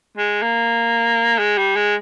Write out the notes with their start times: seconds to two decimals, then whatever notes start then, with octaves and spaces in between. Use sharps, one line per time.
0.17 G#3
0.42 A#3
1.39 G#3
1.58 G3
1.76 G#3